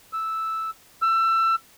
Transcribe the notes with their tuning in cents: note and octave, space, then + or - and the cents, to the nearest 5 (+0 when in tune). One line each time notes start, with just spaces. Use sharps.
E6 -5
E6 +25